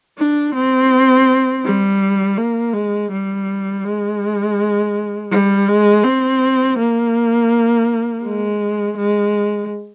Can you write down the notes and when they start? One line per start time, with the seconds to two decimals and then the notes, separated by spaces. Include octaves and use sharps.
0.18 D4
0.54 C4
1.65 G3
2.38 A#3
2.74 G#3
3.12 G3
3.85 G#3
5.31 G3
5.68 G#3
6.04 C4
6.78 A#3
8.24 G#3
8.97 G#3